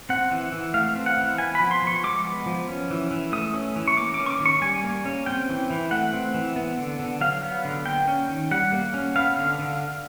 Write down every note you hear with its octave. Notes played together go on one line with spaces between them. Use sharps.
C4 F#5
E3
E3
A3 F5
C4
F#5
E3
B3 G#5
B5
F3
C6
F3 C#6
G#3 D6
B3
F3
C#4
E3
E3
A3 D#6
C#4
E3
C#6
A#3 D6
D6
C#4
C#6
D6
D#3
C#6
G3 G#5
A#3
C#4
C4 G5
E3
E3
A3 F#5
C4
E3
B3
D3
D3
F#3 F5
B3
D3
A#3 G5
C#4
D#3
G3 F#5
A#3
C#4
B3 F5
D3
D3